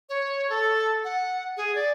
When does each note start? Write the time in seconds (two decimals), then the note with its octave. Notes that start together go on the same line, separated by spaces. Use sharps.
0.09 C#5
0.50 A4
1.04 F#5
1.57 G#4
1.75 D5